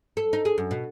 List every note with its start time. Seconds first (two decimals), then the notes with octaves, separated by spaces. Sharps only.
0.17 A4
0.33 D#4
0.45 G#4
0.58 F#2
0.71 B2